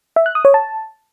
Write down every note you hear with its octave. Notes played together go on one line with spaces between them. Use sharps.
E5
F#6
D#6
C#5
A5